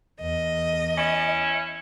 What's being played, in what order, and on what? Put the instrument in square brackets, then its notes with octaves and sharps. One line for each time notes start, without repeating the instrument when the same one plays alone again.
[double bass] E2 [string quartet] D#5
[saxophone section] C#4 E4